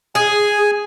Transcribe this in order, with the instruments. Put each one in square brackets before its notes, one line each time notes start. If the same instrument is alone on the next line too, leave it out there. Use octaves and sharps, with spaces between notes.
[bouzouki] G#4 [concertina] G#5